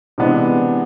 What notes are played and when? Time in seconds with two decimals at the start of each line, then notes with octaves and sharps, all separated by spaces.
0.18 C3 E3 G#3 B3 D4